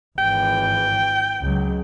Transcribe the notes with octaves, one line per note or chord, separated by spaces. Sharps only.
G#1 E3 G5
C#2 F#3